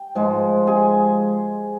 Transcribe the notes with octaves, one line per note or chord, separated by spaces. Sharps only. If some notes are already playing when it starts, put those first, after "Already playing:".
Already playing: G5
G#2 F3 G#3
G#4 G#5